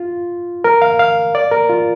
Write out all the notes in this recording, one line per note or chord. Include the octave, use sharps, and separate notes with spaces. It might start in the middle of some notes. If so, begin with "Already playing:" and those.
Already playing: F4
A#4
F5
F5
D5
A#4
F4